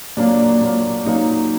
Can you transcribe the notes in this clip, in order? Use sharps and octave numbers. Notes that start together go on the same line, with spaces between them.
A#2 F#3 A#3 D4
A#2 F#3 A#3
A#2 F#3 A#3 D#4